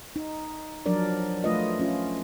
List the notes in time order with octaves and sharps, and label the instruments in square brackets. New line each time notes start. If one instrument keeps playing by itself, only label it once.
[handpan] D#4
F3 F#3 D4 A#4 D5
F3 A3 F4 B4 D#5
C#4 F4